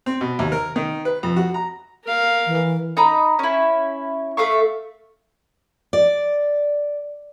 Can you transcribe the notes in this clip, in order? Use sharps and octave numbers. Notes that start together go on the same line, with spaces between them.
C4
B2
D#2
A#4
D#3
B4
F2
F#4
A#5
A#4 F5
E3
D#4 D#5 A#5 B5
C#4 E4
A3 E5 F5 C#6
D5